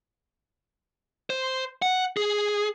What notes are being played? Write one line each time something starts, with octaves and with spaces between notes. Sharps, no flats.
C5
F#5
G#4